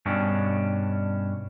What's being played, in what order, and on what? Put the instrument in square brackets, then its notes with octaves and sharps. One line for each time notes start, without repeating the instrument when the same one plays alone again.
[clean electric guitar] G2 B2 C#4 D4